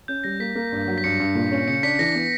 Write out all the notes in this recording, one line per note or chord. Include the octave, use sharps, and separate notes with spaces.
C#4 G6
G3 A#6
A#3 B6
A#3
G2
F#3
B6
G2 C#7
G2
A#2
C#4
C#3 C#7
D4 B6
E3 A#6
B3